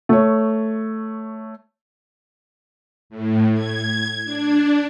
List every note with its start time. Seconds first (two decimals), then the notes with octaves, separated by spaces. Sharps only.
0.09 A3 C#5
3.10 A2
3.54 G#6
4.25 D4